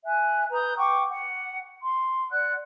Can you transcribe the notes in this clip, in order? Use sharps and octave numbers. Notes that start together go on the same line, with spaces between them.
E5 G#5 F#6
B4 A#5 D#6 G6
F#5 G5 C#6 D6
F#5
C6
D5 F#5 F#6